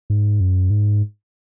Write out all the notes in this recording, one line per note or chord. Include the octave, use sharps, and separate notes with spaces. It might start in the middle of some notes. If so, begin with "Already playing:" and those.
G#2
F#2
G#2